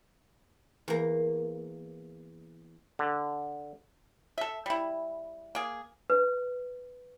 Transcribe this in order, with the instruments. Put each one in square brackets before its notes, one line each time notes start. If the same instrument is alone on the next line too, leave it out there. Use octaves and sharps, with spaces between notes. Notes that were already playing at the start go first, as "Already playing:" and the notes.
[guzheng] E2 A#3
[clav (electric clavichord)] D3
[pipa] A4 E5
G3 E4
A#3 G#4
[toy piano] B4